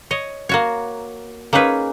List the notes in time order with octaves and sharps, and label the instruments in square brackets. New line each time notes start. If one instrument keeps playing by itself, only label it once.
[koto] C#5 D#5
A#3 F#4 C#5
A#3 C#4 D#4 G#4 B4